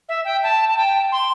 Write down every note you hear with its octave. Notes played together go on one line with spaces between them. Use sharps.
E5
G5
A5
A5
G5
C6